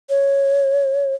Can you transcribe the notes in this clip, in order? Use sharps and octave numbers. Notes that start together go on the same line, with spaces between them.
C#5